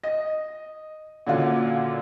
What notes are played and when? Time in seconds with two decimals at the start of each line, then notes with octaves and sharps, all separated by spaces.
0.03 D#5
1.27 A#2 D3 C#4 F4 F#4